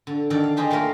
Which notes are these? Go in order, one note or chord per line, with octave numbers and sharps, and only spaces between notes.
D3
D3 D#3 A4 D5
F5
D#4 G4 G#4 C5 D5 D#5
A3 A#3 F4 A#4 F5